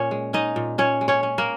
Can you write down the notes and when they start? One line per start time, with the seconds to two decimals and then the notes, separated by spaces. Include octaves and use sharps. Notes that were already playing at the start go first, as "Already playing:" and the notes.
Already playing: A#2 C#4 C#5
0.11 G#3
0.33 C#4 D#4 D#5
0.56 A#2
0.78 A#2 C#4 C#5
1.01 G#3
1.08 C#4 C#5
1.23 C#4
1.38 A#3 A#4